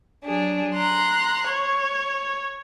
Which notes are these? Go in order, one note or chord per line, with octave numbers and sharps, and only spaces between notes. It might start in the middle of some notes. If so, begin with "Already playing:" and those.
F#3 D4 G#4
A#5 C6 F#6
C#5